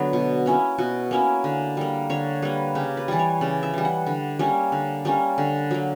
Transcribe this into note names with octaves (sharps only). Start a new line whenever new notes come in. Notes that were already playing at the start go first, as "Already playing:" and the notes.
Already playing: D3 F#3 B3
B2
A#3 C#4 E4
B2 F#4
A#3 C#4 E4
D3
G3 A#3
D3 C#5
G3 A#3 B4
C#3 G4
B4
E3 G3 D5
C#5
C#3 D5
E5
E3 G3
F#5
D3
G3 A#3 C#4
D3
G3 A#3 C#4
D3
F#3 A#3